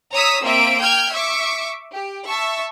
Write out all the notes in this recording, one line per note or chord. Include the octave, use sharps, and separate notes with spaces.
C#5 A#5 D#6 E6 B6
A#3 C4 E5 D7
G5 F6 G6 G#6
E5 C#6 D6
G4
E5 A5 C#6